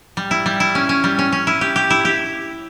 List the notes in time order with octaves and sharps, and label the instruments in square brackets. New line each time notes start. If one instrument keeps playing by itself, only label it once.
[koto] G3
E4
G3
E4
C#4
C#4
G3
C#4
C#4
E4
G4
G4
E4
G4